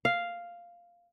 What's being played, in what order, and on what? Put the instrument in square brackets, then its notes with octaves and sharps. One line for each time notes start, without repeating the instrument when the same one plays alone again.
[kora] F5